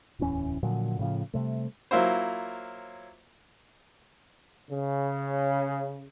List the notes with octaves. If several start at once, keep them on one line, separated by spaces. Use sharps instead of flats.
D1 E2 E3 C#4
A#2 D3 F3 F#3
A2 C#3 F3
C3 G3 A3
F#3 A#3 E4 F4 C5
C#3